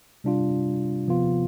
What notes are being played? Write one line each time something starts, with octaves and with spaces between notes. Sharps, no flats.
C3 G3 D4 F4
C3 F3 B3 F4